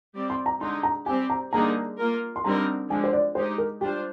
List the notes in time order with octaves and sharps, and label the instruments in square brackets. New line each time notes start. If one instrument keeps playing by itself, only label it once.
[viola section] G3 C4 G4 D5
[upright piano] C6
A#5
[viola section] D3 G#3 D#4 [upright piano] C6
[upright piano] A#5
[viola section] G3 C4 G4 [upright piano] G#5
[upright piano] A#5
[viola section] D3 G3 A#3 D#4 G#4 [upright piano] A#5
[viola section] A#3 F4 A#4
[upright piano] C6
[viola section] D3 G3 C4 D#4 A#4 [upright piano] A#5
[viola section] D3 F3 G#3 [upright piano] G#5
[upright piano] C5
D5
[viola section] G#3 D#4 G4 [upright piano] C5
[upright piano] A#4
[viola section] G3 D4 F4 C5 [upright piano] G4